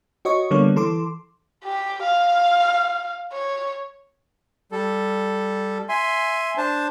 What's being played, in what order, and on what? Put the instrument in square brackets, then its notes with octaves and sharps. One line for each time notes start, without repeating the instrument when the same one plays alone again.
[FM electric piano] F#4 C#5 D#5 C#6
D3 G3 A#3 B3 C#5
E3 A4 C6 D6
[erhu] G4
F5
C#5
[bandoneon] G3 A4
E5 G#5 C6
D4 C5 A5